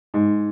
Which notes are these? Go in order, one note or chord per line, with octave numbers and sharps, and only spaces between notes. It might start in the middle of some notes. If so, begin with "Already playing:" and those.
G#2